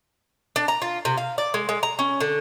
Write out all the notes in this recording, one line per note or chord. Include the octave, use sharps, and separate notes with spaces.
D4
A#5
F4
C3
F5
D5
G#3
G#3
A#5
C#4
D3